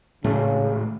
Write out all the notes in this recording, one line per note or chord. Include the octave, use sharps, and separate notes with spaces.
G#1 A2 C#3 A3